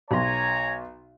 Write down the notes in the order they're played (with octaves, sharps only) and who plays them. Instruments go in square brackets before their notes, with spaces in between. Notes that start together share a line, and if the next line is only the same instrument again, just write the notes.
[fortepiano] B1 C6 [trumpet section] C#5 G#5 A#5